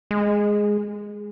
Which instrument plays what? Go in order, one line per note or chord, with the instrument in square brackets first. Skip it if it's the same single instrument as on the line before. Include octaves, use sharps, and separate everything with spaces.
[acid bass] G#3